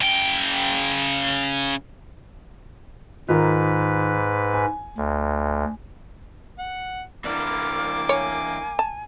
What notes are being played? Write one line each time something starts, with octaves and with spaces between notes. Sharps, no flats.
C#3 G5
G#2 D#3 F4 A#4 B4
G#5
D2
F#5
E3 A#3 D4 D6 F6
C#5 G#5
A5